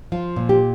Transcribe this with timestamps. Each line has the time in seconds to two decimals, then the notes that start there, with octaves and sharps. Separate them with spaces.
0.12 F3 F4
0.36 A#2
0.49 G4